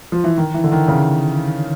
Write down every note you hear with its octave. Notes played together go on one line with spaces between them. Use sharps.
F3
E3
D#3
E3
D3
D#3
C#3